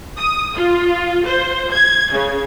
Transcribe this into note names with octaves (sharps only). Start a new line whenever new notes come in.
D#6
F4
C5
G#6
C#3